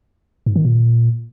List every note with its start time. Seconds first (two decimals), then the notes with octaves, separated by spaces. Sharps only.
0.46 G#2
0.56 D#3
0.65 A#2